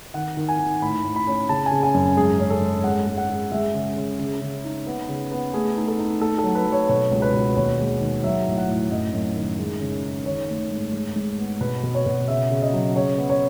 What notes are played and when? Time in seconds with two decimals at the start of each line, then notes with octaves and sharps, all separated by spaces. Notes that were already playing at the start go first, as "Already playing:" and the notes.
0.14 D#3 F#5
0.37 D#3
0.48 G#5
0.59 D#3
0.82 A2 B5
1.04 A2
1.16 B5
1.27 C#4
1.49 C#3 A5
1.66 G#5
1.71 C#3
1.83 G#5
1.94 F#2
2.17 G#2 G#4
2.39 C#4
2.50 A4
2.62 G#2
2.84 G#3 F#5
3.07 G#3
3.18 F#5
3.29 G#3
3.51 G#3 E5
3.74 C#3
3.96 C#3
4.19 C#3
4.41 C#3
4.64 D#4
4.87 B3
5.09 C#3
5.32 B3
5.54 A3 G#4
5.76 D#4
5.88 A4
5.99 D#4
6.21 A3 A4
6.38 A4
6.44 F#3
6.55 B4
6.67 F#3
6.72 C#5
6.89 B2 C#5
7.11 C#2
7.22 B4
7.34 B2
7.56 D#2 C#5
7.79 G#3
8.01 D#3
8.24 F#3 E5
8.47 A2
8.58 F#5
8.68 A2
8.91 F#2 D#5
9.14 F#2
9.36 D#3
9.59 G#3
9.81 C#3
10.03 D#4
10.26 D#3 C#5
10.49 A3
10.71 G#2
10.93 G#2
11.16 G#2
11.38 B3
11.61 B2 B4
11.83 B2
11.95 C#5
12.06 B2
12.28 C#3 E5
12.51 C#3
12.62 D#5
12.73 F#3
12.96 C#3 C#5
13.18 B3
13.29 C#5